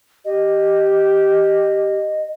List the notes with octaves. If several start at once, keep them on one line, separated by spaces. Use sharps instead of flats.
G4 D#5